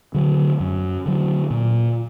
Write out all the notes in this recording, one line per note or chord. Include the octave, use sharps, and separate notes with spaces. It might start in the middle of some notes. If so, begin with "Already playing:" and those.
D3 F#3
F#2
D3 F#3
A#2